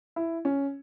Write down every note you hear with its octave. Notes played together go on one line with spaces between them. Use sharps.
E4
C#4